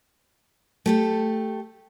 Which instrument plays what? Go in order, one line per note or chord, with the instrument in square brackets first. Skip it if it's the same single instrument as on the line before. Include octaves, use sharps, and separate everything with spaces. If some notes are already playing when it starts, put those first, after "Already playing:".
[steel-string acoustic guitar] A3 G4 A4